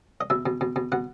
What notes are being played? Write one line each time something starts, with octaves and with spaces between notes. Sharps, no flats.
D#5
B2 E5
B2
B2
B2
B2 F#5